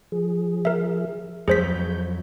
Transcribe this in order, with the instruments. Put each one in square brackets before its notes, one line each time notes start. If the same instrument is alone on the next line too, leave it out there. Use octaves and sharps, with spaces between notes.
[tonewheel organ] F3 G#4
[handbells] A#4 E5
[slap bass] F2 F#3 [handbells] G#4 C5 B6 [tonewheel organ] G6